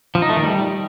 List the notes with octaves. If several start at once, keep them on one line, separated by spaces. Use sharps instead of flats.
F3
D#4
A3
D#3
G3